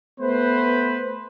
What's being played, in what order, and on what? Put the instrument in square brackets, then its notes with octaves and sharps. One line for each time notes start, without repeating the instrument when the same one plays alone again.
[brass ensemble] A3 B3 B4 C5